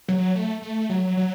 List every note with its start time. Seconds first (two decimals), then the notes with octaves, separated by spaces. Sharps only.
0.08 F#3
0.35 A3
0.62 A3
0.89 F#3
1.17 F#3